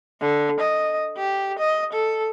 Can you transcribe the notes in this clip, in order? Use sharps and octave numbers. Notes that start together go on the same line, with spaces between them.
D3
D#5
G4
D#5
A4